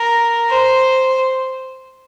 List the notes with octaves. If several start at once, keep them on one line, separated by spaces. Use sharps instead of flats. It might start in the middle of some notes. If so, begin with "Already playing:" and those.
Already playing: A#4
C5